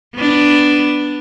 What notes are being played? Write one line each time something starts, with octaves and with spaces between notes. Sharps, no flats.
B3 D4